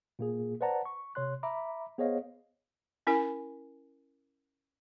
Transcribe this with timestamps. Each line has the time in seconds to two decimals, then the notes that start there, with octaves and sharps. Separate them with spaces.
0.19 A#2 A#3 G#4
0.61 B4 C5 D5 F#5 A5 A#5
0.85 C#6
1.15 C3 C#5 C6 F#6
1.43 E5 A#5 B5 D6
1.98 B3 G#4 C5 C#5 D#5 F5
3.07 C#4 E4 A#4 G#5